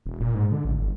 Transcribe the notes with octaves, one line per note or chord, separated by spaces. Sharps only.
E1
A#2
G#2
D3
A1
G1